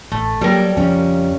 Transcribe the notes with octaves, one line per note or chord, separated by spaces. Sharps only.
A1 A3
F#3 G3 A#3 G4 A4 A#4
F2 C#3 F3 C#4